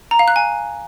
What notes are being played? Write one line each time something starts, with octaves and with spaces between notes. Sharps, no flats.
A#5
F5
F#6
G#5